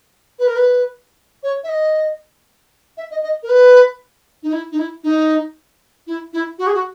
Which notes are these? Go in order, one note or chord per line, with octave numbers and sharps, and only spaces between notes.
B4
A#4
B4
C#5
E5
D#5
E5
D#5
D#5
A#4
B4
D#4
E4
D#4
E4
D#4
E4
E4
F#4
G#4
F#4